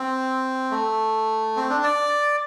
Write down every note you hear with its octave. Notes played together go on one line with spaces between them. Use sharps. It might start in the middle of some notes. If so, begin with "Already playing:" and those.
Already playing: C4
A3
C4
D4
D5